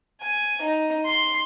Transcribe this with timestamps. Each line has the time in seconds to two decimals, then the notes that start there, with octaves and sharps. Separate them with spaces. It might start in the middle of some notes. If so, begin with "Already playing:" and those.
0.21 G#5
0.61 D#4
1.06 C6